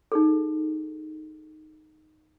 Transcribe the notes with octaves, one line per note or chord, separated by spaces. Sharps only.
D#4 G#4 A4